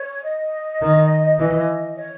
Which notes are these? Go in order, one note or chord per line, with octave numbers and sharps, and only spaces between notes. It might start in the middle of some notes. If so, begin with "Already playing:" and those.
Already playing: C#5
D#5
D#3
E3
C#5